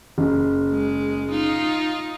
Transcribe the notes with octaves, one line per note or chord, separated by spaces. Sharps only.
F#1
G#3
D#4 F4